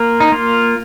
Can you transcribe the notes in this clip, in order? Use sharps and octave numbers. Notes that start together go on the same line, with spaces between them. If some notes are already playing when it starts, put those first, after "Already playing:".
Already playing: A#3 F4
D#4
A#3 F4